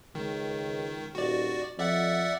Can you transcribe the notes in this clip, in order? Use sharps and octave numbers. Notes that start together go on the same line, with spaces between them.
C#2 D#3
D#1 F#4 D5
F2 D5 E5 F#5